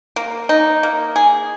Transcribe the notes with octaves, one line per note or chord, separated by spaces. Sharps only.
A#3
D#4
A#3
G#4